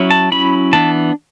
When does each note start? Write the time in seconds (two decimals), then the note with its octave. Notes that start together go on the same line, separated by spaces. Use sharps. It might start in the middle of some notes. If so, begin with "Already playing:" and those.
Already playing: F#3 C#4 E4
0.11 A5
0.32 F#3 C#4 E4 B5
0.73 E3 B3 D4 A5